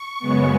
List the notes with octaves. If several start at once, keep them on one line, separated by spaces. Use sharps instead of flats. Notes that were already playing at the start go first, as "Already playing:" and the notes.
Already playing: C#6
F#2 C#3 G#3 B3